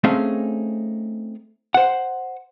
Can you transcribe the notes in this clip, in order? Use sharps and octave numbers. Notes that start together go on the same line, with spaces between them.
A3 C4 C#4 D#4 G#4 F5
C5 F#5